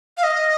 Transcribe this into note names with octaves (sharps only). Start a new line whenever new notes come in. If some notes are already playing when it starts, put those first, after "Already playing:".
F5
D#5